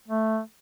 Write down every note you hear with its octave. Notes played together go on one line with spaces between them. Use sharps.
A3